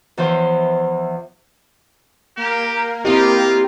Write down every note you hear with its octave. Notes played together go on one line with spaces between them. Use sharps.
E2 E3 F3 C5
A#3 G4 A#4
C4 E4 F4 G4 D#5